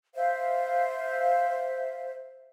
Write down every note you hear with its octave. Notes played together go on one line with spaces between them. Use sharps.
C5 E5 F5